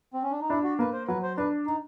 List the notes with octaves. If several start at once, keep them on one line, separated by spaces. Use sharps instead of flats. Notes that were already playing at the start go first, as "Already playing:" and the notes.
C4
C#4
D4
D#4
D4 E4
F#4
A#3 B4
C5
F#3 B4
C5
D4 B4
D#4